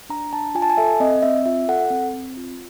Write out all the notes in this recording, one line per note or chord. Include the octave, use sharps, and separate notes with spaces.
D4 A#5
D4 A5
F4 G#5
A5
G#5
A4 E5
C4 D#5
C4 E5
F4 E5
A4 F#5
C4
C4
F4